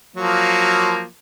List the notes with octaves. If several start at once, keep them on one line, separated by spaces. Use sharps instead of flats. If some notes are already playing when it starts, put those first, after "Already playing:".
F3 F#3 A#3